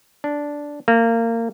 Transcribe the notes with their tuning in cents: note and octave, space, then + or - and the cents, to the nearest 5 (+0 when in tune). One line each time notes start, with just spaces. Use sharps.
D4 -10
A#3 -25